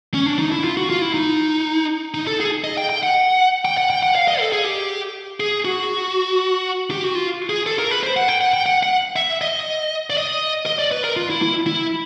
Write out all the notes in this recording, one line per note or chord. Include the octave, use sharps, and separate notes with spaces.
C#4
D4
D#4
E4
F4
F#4
F4
E4
D#4
D#4
A4
G#4
D#5
G5
G5
F#5
G5
F#5
G5
F#5
F5
D#5
A4
G#4
G4
G#4
F#4
G4
F#4
F4
G#4
A4
A#4
B4
C5
F#5
G5
F#5
G5
F#5
F#5
E5
D#5
D5
D#5
D#5
D5
B4
A#4
F4
E4
E4
E4